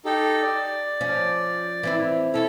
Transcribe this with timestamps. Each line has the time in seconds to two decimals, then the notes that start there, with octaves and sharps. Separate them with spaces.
0.05 D#4 G4 A4
0.42 D5
1.01 F3 C#4
1.83 E3 C4 E4
2.34 C#4 E4 A4 C#5